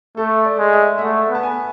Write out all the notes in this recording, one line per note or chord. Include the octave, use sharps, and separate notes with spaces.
A3 A4
D5
G#3
E5
E5
A3 F#5
B3
A5
G#5